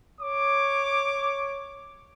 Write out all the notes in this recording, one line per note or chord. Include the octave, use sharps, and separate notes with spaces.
C#5 D6